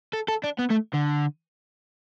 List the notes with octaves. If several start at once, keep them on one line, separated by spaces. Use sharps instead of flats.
A4
A4
D4
B3
A3
D3